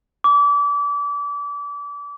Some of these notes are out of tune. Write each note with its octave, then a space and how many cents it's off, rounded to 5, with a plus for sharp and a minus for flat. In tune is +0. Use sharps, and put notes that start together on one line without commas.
D6 -30